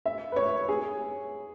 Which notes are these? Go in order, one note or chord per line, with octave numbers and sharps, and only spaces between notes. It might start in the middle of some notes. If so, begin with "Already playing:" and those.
E5
B4
C#5
G#4